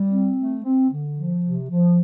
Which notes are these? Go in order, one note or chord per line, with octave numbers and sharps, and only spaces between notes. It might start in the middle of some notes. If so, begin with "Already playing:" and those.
Already playing: G3
C4
A3
C4
D3
F3
C3
F3